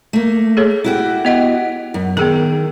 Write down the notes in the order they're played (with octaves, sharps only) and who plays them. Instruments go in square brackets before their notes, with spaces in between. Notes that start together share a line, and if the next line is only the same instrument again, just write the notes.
[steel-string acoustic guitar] A3 A#3
[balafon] G#4 A4 C#5
[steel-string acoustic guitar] E4 F#4 G4
[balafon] B3 D#5 F#5
[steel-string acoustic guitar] F#2
[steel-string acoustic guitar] D#3 [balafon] B3 G#4 A#4